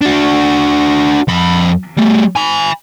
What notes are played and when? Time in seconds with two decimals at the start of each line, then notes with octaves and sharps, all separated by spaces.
0.02 D4 F#4
1.28 F2 B5
1.97 G3 A3
2.36 G#5 B5